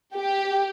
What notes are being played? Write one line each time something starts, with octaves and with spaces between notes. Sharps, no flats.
G4